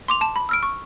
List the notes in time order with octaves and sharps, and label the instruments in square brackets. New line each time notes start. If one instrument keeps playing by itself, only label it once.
[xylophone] C6 D6 F7
A5 E7
B5
E6 F6 D7
C#6